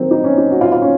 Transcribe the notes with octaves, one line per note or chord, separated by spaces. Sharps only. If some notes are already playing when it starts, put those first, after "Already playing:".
Already playing: D#3 F#3 A#3 C4
D#4
C#4
D#4
F#4
F4
F4
C#4